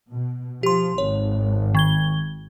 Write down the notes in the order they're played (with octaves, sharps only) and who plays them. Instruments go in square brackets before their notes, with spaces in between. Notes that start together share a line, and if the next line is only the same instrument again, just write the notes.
[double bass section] B2
[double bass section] F3 [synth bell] G4 C6
[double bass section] G#1 [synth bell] C#5
[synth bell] D#3 G#6 G7